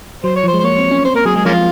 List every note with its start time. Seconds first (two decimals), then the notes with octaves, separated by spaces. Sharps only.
0.24 F#3 C5
0.36 C#5
0.44 F3 C5
0.54 G#3
0.59 C5
0.64 A#3 C#5
0.78 C4
0.91 C#4
1.05 C4 C5
1.14 A#3 A#4
1.25 F#3 G#4
1.35 G#3 G#4
1.45 F3 A#3 C#4 F4